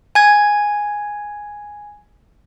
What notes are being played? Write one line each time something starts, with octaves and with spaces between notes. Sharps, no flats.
G#5 G#6